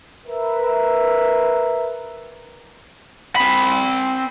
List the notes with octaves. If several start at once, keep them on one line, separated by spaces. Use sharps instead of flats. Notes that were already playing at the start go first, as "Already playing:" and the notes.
A#4 B4 E5
C4 B5